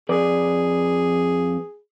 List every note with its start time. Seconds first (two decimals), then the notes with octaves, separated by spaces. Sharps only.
0.09 F2 G#4 B4 D5